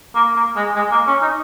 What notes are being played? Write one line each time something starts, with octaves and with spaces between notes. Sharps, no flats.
A#3
A#3
G#3
G#3
A#3
C#4
D#4